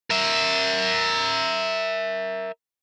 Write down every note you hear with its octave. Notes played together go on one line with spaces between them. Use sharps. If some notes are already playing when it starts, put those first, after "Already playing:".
A#4 E5